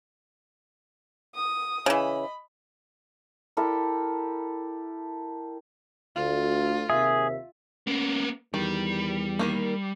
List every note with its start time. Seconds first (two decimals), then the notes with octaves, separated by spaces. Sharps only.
1.35 D#6
1.86 C#3 E3 D#5 B5
3.57 E4 G4 A4 A#4
6.16 D2 F4
6.90 D#2 C3 G#4 E5
7.87 A#3 B3 C#4
8.54 E2 D#3 G3
9.39 D#3 F3 A#3